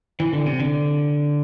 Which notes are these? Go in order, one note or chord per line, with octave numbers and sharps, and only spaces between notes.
E3
D3
C3
D3